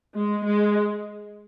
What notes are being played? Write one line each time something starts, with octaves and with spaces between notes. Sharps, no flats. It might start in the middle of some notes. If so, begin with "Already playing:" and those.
G#3
G#3